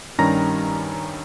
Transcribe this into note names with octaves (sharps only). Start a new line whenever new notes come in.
G2 D#3 G3 C#4 A#5 A#6